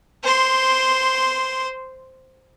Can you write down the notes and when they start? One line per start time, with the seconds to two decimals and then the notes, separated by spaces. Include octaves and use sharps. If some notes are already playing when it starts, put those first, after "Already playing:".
0.24 C5 C6